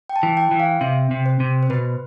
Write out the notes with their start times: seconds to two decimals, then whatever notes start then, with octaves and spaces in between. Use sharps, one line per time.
0.09 G5
0.16 A5
0.23 E3
0.37 G5
0.51 E3
0.60 F5
0.81 C3 E5
1.11 C3
1.26 C5
1.40 C3
1.63 C5
1.70 B2 B4